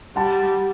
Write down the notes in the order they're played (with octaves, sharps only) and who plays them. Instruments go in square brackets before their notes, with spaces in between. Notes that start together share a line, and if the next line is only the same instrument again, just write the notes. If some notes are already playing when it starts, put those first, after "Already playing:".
[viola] G3 [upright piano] F#5 A5